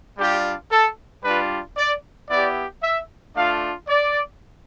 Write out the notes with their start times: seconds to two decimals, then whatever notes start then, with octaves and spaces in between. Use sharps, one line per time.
0.18 G3 D4 F4 G4
0.72 A4
1.24 G3 D4 F4 B4
1.77 D5
2.29 B3 E4 G4 D5
2.83 E5
3.35 A3 D4 F4 F5
3.88 D5